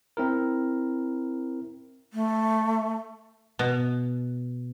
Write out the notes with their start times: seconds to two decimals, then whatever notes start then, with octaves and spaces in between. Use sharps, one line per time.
0.17 C4 E4 A#4
2.13 A3
3.59 B2